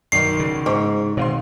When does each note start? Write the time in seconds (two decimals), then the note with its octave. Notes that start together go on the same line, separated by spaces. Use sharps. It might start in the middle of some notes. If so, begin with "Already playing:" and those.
0.12 B1 D#3 D5 C7
0.39 C#3
0.66 G#2 C#6 D6
1.17 B2 D#3 C4 F5 C6